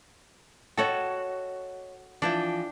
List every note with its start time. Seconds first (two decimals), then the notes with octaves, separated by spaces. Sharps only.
0.77 F#4 A4 C#5 D#5 G5
2.22 E3 F3 D4 E4 G5